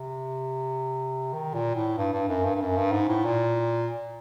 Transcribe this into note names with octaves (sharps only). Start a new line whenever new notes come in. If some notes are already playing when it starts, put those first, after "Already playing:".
Already playing: C3
D#3
A#2
A2
G2
G2
F#2
G2
G2
F#2
G2
G#2
A2
A#2